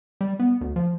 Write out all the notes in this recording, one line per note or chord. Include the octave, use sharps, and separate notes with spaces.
G3
B3
D2
F3